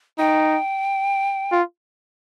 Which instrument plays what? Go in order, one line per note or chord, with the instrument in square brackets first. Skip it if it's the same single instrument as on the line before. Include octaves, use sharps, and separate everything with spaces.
[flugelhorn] D#4 [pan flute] G5
[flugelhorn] F4